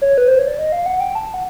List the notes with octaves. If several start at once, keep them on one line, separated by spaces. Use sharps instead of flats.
C#5
B4
C5
C#5
D5
D#5
F5
F#5
G5
A5
F#5